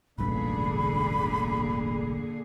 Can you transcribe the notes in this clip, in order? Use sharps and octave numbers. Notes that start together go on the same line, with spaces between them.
E1 A1 G2 A#2 D3 G#4 B5